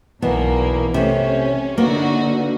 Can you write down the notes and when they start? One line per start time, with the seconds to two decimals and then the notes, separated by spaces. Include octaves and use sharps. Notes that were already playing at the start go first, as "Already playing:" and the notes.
0.22 B1 E2 B2 E3 A#3 B3
0.94 C3 A3 C#4
1.78 D3 A#3 B3 D#4 F#4